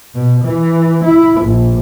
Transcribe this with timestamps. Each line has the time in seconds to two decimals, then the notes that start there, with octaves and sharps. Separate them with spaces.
0.14 B2
0.45 E3
1.04 E4
1.41 A#1